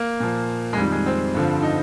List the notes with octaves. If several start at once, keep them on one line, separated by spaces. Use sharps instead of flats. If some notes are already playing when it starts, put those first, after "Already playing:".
Already playing: A#3
A#2 F3
G#3
F2 D#3 G3
G#3
C4
G2 D3 F3
D#4